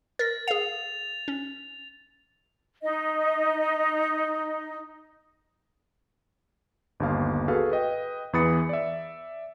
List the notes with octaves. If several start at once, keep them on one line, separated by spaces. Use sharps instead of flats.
A#4 A6 A#6
G#4 F5 F7
C#4
D#4 D#5
G1 D#2 F5
F#4 G#4 A4 B4 F5
B4 D#5 G5
E2 E3 B5 D#6 A6 C#7
D5 E5